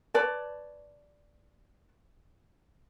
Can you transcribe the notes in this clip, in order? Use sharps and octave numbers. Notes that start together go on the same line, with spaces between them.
B4 C#5 D5 A5